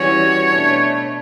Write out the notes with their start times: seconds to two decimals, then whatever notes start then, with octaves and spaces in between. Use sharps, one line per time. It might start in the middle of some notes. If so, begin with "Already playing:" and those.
Already playing: E3 G3 C#4 F#4 C#5
0.48 B2 A3 D4